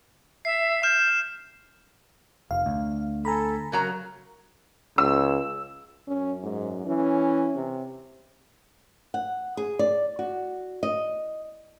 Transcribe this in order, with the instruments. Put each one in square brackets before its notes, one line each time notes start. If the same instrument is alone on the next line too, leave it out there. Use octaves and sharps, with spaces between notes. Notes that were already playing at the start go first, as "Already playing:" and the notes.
[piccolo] E5 [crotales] C7
[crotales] F6 E7 [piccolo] G6
[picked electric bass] F1 [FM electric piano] F5
[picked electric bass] D2
[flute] A4 [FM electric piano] G#5 A#5 B5
[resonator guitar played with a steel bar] C#3 F#3 A#5 [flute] A#4
[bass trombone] C#2 [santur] E6
[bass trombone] F#2 [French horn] C#4
[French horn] G#2
[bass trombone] E3 [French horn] C#4
[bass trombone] C3
[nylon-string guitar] F#5
G#4
D5
F#4
D#5